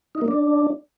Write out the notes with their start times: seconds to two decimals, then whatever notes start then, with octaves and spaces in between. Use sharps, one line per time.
0.15 D#4
0.21 A#3
0.28 D4